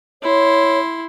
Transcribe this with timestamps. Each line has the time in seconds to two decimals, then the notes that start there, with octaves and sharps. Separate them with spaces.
0.23 E4 C#5 C6